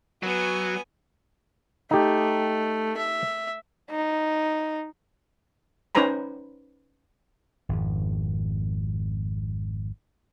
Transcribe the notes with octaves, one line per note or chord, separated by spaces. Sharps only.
F#3 B3 G#5
A3 D#4 G4
E5
D#4
C#4 D#4 B4 C5 A#5 B5
G#1 F2